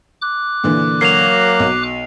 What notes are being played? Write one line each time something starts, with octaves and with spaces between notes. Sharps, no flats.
D6 F#6
A#2 D3 E3
F#3 A#3 C7 F7
B1